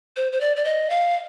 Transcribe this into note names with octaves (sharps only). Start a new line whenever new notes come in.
C5
C5
D5
D5
D#5
F5